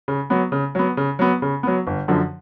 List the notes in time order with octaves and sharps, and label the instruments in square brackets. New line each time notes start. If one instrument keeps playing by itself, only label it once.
[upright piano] C#3
F#3 B3
C#3
F#3 B3
C#3
F#3 B3
C#3
F#3 B3
G1
F#2 D3 F3